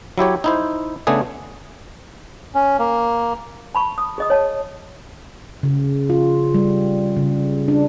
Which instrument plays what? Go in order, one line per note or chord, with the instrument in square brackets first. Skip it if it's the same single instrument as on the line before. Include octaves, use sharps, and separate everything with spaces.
[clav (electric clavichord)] F#3 E4 G4 C#5
D#4 E4 C5
C#3 A3 B3 D4 G#4
[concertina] C#4
A#3
[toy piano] A5 B5 C#6
D#6
G#4 D#5 D#6
C#5 A5
[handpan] C#3
F4
G3
C#3
D4